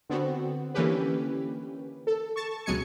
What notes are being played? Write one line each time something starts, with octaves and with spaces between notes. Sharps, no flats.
D3 B3 C4 F#4
D3 E3 A#3 C#4 G4 B4
A4
A5 C#6
C#2 B2 F#3 G#3 G#5 C#7